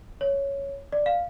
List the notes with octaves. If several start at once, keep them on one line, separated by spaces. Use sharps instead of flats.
C#5
D5
F5